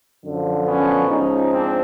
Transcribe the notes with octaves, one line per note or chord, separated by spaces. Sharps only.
F#2 D3 F3
B3 C#4
G#2 F3 G#3 C#4 D#4
C4 D4